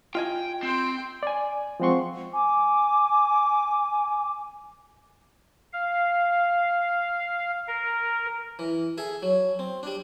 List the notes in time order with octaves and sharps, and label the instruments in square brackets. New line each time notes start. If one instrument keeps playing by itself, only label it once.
[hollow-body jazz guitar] F4 D#5 G#5 [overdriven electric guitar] G5
[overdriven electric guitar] C4 [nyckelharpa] G5 C6
[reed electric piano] D5 G#5
F3 G#3 C4 F#5 C6 C#6
[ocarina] G#5 [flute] D6
[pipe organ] F5
A#4
[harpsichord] E3
G#4 A4 E5
F#3
C4
G3 D4